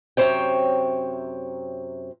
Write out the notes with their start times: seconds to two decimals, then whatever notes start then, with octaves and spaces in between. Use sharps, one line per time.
0.17 F#2 C3 A#3 C5 C#5 G5